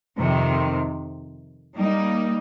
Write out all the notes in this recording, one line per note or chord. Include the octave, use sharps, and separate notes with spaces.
F2 C3 D#3
G3 A#3 D#4